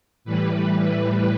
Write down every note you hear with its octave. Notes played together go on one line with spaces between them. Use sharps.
A2 E3 G3 B4